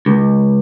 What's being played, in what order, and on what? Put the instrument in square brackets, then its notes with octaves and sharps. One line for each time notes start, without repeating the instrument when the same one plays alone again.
[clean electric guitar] C#2